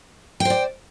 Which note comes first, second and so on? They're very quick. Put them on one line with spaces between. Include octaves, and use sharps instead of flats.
G5 C5 D5